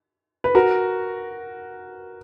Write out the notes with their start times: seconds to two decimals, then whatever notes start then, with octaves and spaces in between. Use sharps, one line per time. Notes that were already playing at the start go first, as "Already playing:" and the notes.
0.44 B4
0.55 F#4 A#4